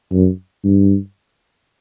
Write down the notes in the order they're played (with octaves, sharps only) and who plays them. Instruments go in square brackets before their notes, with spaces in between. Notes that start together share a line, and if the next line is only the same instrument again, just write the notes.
[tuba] F#2
G2